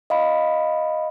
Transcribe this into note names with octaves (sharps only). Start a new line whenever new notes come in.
D#5 F5 B5